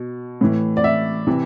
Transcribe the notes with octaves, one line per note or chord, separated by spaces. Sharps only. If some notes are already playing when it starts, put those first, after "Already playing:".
Already playing: B2
A2 E3
D5
E5
C3 E3